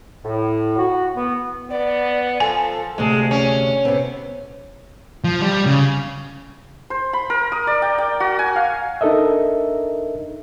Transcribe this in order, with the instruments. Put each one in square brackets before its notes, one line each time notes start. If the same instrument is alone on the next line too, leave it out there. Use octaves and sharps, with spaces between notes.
[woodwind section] A2
F#4
B3
[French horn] B3 [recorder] D5
[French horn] F3 [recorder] A4 [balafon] G#5
[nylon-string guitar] D2 C3 [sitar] G#3
[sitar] C#4
[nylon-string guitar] C3 B3 C4
[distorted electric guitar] F3
G3
C#3
[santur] C5
B5
A#4
D#6
D5
G5
G5
F#4
G#5
F5
[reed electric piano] D4 D#4 A4 A#4 D#5 E5